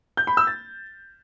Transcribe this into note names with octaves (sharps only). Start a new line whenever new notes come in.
G6
B5
E6
A6